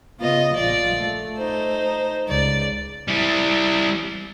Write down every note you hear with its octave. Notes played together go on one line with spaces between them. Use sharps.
C#3 B3 F4 D#5
A#1 F3 F4 D5
A3
D#4 C5
C#2 D5
G3 E4